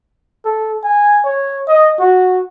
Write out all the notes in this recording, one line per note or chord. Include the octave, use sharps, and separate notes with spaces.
A4
G#5
C#5
D#5
F#4